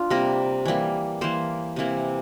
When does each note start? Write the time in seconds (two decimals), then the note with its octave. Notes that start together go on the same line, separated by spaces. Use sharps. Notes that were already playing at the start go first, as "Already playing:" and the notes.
Already playing: D4 F4
0.10 C3 G3 A#3 A#4
0.66 E3 G3 A#3
1.21 E3 A#3 C5
1.76 C3 E3 A#3